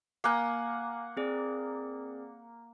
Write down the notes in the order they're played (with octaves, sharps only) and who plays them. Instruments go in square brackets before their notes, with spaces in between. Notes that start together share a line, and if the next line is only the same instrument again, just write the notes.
[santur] A#3 F#5 [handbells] F5 G#5
[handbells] C4 G#4 D5